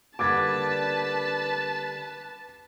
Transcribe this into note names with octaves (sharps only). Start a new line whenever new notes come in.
D3 G3 A#3 B4 A5 D6 G#6 A6